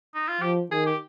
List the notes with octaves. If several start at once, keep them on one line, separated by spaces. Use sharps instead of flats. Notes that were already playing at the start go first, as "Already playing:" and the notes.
D#4
F4
F3 G4
D#3 G#4
G4